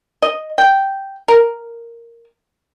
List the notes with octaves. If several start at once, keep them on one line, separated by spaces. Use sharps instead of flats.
D#5
G5
A#4